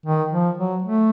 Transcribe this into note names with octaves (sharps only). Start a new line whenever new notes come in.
D#3
F3
F#3
A3